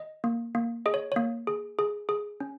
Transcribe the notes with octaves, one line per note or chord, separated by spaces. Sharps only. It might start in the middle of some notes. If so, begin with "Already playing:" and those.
Already playing: D#5
A#3
A#3
G#4 D#5
C#5
A#3 C#5
G#4
G#4
G#4
C#4